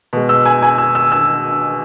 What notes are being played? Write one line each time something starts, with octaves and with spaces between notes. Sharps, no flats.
B2 G#3
E6
G#5
G#5
E6
E6
E6